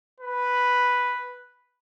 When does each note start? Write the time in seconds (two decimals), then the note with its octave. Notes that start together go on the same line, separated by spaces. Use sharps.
0.21 B4